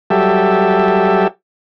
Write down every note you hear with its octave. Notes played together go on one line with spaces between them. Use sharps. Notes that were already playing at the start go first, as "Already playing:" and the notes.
F#3 G3 G4 A4 E5